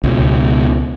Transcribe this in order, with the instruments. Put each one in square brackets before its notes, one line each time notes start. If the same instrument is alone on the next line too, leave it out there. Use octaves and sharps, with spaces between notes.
[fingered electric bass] C#2 B2